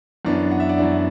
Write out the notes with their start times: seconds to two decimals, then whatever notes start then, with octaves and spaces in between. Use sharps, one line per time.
0.25 F#2 E3 B3 D4
0.51 F#5
0.60 E5
0.69 D5 F#5
0.78 F#2 E3 B3 D4